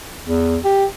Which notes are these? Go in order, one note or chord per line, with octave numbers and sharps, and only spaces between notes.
E2
G4